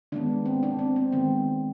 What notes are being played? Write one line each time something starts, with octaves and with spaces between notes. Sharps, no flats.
D#3 G#3 B3 D4
C4
D4
C4
C4
D#3 G#3 B3 C4